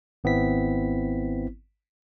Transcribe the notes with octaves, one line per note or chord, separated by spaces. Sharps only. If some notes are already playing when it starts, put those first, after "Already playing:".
G#1 B3 C4 E4 B6